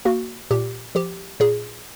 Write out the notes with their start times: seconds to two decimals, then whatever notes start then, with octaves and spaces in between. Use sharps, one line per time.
0.05 A#3 F#4
0.51 A#2 G4
0.95 F3 G4
1.40 A#2 G#4